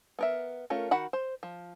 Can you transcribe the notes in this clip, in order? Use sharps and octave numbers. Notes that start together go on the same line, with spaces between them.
B3 A#4 E5
A3 C#4 F4 A#4
D#3 F#4 F#5 B5
C5
F3